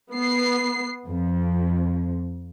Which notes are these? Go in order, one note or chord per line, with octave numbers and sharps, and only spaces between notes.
B3 C7
F2